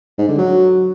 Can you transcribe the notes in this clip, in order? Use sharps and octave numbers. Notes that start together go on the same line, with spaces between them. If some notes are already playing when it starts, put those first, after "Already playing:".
G#2
D3
F#3